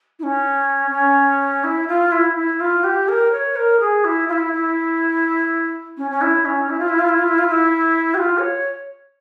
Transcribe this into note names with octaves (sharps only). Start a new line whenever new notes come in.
E4
C#4
C#4
E4
F4
E4
E4
F4
G4
A#4
C#5
A#4
G#4
E4
F4
E4
E4
C#4
C#4
E4
C#4
E4
F4
E4
F4
E4
F4
E4
F4
E4
G4
F4
C#5